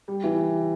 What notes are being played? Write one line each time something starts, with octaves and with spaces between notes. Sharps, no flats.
G3
E3